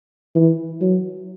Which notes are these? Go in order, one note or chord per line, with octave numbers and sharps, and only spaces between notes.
E3
F#3